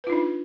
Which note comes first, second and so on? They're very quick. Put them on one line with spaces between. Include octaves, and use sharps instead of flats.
B4 F4 D#4 D4